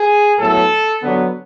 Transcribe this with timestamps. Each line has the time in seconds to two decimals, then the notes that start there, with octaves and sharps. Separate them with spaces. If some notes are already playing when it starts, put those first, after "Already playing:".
Already playing: G#4
0.39 A2 F#3 B3 A4
1.02 D3 F#3 B3